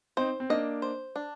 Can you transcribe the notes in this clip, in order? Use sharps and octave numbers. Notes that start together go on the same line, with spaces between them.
C4 D#4 C5
C4
A#3 D4 D#5
C5
D4